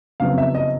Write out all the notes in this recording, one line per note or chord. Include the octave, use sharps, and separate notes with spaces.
F#1 F2 C#3 F#3 B3 F5
E5
D#5